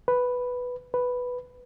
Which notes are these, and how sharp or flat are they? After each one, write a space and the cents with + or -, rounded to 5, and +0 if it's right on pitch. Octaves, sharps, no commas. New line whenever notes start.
B4 +0
B4 +0